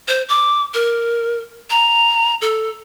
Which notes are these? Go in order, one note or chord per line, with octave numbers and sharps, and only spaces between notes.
C5
D6
A#4
A#5
A4